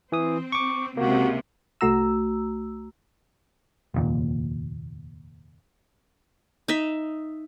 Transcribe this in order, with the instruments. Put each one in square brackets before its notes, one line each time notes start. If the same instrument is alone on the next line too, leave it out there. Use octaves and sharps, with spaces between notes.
[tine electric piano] E3 D#6 [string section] C4
[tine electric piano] C#6 D6
[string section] C#2 C3 [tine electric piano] A#3 [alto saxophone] F#4
[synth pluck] C2 A3 F#4 A#5 E6
[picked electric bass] F1 D#2 A#2
[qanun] D#4 E5